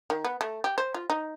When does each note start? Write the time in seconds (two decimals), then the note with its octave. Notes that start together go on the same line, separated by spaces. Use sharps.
0.10 D#3
0.25 B3
0.41 A3
0.64 G4
0.78 C5
0.94 F4
1.10 D#4